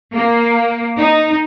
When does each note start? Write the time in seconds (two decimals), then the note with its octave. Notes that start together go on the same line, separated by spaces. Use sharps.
0.14 A#3
0.97 D#4